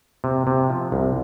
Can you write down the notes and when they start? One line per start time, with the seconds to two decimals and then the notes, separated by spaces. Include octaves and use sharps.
0.24 C3
0.47 C3
0.70 F3
0.92 C2